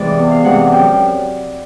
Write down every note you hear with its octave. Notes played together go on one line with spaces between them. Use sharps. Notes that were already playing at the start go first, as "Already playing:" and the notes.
Already playing: C3 E3 G#3 D5
E2
F5
C3 E3 G#3 F#5
F#5
F#2 G5